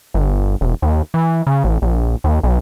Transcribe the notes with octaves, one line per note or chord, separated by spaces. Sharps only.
G1
E1
D#2
E3
C#3
A1
A#1
D#2
B1